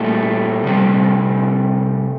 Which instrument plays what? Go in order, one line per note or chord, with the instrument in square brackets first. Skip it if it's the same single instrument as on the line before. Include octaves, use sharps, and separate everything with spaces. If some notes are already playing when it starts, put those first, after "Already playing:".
Already playing: [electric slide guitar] A#2 G3 A3
C3 G3